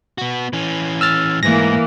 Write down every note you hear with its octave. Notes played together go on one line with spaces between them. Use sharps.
B3 F#4
E3 C#4
E6 F6 A6
G#2 E3 A#3 A#6